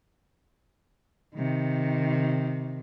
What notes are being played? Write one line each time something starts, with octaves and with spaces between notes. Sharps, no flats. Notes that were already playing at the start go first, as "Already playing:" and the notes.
C3 D#3